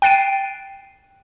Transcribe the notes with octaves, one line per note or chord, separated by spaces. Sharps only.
G5 F#6 A6 C7 D7 D#7